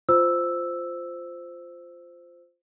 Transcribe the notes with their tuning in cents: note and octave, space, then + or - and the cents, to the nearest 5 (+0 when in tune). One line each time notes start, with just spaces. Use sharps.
F4 +0 C5 -10 E6 +0